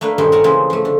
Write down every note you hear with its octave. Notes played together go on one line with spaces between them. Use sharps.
A3 A#3 D4 B4 F5
G2 A#2 D#3 F3 G3 G#3
A#4 C#5 F#5 G#5 A5
C#3 E3 F3 G#3 A#3 C4
F3 A3
D3